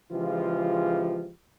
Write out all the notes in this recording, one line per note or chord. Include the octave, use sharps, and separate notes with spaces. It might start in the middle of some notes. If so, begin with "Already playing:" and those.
C#3 E3 F3 G#3 F4 G4